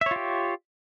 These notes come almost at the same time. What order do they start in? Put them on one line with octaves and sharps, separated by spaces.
E5 C#5 F4 G4